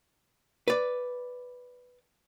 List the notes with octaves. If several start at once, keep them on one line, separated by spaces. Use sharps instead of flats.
B4 D5